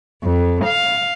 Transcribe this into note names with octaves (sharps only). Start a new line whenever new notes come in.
F2
F5